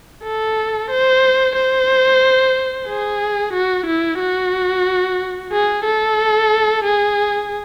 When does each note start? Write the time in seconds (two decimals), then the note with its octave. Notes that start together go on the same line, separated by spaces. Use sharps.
0.24 A4
0.91 C5
1.56 C5
2.88 G#4
3.54 F#4
3.87 E4
4.20 F#4
5.52 G#4
5.85 A4
6.84 G#4